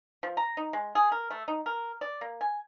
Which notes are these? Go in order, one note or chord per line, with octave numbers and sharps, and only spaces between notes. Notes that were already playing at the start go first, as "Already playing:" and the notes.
F3
A#5
D#4
G#3
G#4
A#4
A3
D#4
A#4
D5
A#3
G#5